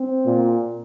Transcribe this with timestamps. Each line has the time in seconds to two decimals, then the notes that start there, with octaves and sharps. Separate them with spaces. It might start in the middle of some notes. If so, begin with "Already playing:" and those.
Already playing: C4
0.26 A#2